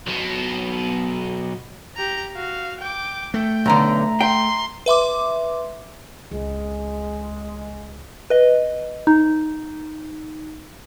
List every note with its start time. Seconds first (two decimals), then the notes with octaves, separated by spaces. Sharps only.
0.07 B1 B2
1.97 G4 A#5
2.35 F#4 F5
2.81 G5 D6
3.34 A3 G5
3.66 B1 D3 E5 A#5
4.21 G5 C6
4.86 B4 E5 C6 D6
6.31 C#2 G#3
8.30 B4 D#5
9.07 D#4